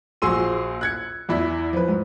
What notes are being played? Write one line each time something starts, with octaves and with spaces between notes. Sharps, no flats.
A#1 F#4 G#4 C6 E6 D#7
F#6 G#6 C#7
E2 E4 D5 B6
F3 B4
G#2